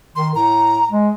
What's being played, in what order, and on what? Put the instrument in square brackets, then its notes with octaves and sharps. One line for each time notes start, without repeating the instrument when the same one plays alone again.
[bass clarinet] D#3 [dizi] C6
[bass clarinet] A2 [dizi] A#5
[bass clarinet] G#3